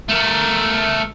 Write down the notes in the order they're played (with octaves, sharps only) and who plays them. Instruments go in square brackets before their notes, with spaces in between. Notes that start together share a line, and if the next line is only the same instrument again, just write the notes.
[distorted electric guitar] A3 A#4